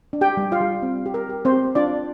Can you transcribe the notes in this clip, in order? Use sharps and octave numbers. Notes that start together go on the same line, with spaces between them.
D4
G4 G5
G3
F4 F5
G3
C4
G4
A#4
G4
C4 C5
G4
D4 F4 D5